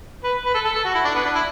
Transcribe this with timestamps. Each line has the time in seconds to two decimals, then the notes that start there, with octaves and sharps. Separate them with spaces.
0.24 B4
0.45 B4
0.54 A4
0.65 A4
0.75 A4
0.84 F#4
0.94 E4
1.05 D4
1.15 B3
1.25 D4
1.35 E4